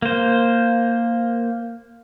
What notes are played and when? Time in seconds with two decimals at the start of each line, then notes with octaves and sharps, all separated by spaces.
0.02 A#3 C5